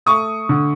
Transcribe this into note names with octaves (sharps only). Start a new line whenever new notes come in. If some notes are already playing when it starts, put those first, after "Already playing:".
A3 C#6 D#6
D3